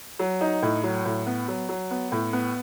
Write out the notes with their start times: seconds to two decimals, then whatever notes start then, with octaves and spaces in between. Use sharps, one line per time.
0.19 F#3
0.41 D#4
0.62 A2
0.83 F#3
1.05 A2
1.26 B3
1.48 F#3
1.69 F#3
1.91 B3
2.12 A2
2.33 B3